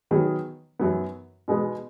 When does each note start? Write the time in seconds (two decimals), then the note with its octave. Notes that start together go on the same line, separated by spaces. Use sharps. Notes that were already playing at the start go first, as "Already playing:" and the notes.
0.11 D#3 F#3 B3 G#4
0.79 F#2 F#3 B3
1.48 B2 G#3 B3 G#4 B4